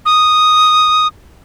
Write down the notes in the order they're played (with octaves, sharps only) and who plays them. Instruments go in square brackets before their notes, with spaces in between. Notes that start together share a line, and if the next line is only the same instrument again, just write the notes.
[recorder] D#6